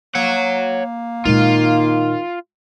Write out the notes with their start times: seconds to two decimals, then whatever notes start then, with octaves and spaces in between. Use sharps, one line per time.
0.15 A#3 C#5 F#5
1.25 A#2 D#3 G#3 F4